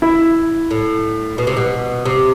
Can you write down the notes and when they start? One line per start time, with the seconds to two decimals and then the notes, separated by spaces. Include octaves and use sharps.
0.02 E4
0.71 A2
1.38 B2
1.47 C3
1.57 B2
2.05 C3